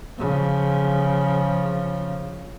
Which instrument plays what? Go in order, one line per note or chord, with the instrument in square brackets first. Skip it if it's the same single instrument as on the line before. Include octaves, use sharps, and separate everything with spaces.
[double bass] C#3 F3